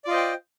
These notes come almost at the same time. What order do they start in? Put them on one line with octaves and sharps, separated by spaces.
D5 F4 D#5 C5 G5